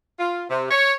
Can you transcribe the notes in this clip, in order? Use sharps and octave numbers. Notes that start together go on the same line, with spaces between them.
F4
C3
C#5